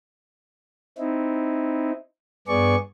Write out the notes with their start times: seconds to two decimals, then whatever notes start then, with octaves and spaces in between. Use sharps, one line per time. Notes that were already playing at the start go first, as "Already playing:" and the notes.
0.98 C4 D#4 E4
2.47 G2 B3 G#4 D5 C#6